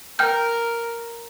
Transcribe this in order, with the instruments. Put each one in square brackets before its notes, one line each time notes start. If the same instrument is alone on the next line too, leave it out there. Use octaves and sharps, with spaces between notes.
[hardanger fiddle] A#4 [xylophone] G5 F6 G6